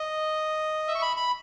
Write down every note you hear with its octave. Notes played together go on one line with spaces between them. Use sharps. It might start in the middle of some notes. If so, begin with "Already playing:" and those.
Already playing: D#5
E5
C#6
B5
B5